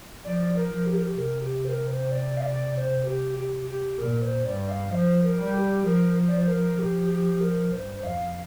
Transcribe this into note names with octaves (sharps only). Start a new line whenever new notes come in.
F3 D5
A#4
F3
G4
A#4
G4
C3 A#4
G4
C5
A#4
C5
D5
F5
D5
D5
C5
G4
G4
G4
A#2 A#4
C5
G2 D5
F5
F3 C5
A#4
G3
G4
F3 A#4
D5
C5
A#4
F3 G4
G4
A#4
G2 C5
F2 F5